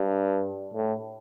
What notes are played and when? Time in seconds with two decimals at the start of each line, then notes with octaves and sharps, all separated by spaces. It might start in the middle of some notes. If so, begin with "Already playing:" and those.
Already playing: G2
0.73 A2